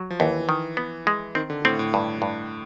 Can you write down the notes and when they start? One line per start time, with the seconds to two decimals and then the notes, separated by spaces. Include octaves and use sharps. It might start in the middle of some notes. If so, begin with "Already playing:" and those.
Already playing: F#3
0.10 F3
0.20 D#2 E3
0.49 D#3
0.77 B3
1.07 G#3
1.35 D#3 C4
1.50 D3
1.65 A2 C4
1.79 A2
1.94 G2
2.22 G2